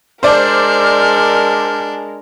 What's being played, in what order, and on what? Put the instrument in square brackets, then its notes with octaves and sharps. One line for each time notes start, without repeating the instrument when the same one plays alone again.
[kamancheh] G#3 A#4 [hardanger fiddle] D4 [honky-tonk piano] C5 D5 [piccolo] F6